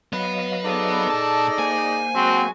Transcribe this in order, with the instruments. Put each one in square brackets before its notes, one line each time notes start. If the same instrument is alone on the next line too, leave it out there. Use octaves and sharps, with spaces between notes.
[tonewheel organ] F#3 D#5 F5 [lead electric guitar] B3 B4
[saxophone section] D#4 G#4 D5 [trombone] A4
[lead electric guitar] A#2 A5
[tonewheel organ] A#3 C5 [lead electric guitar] G#5
[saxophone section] F#3 G#3 F#4 [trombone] C4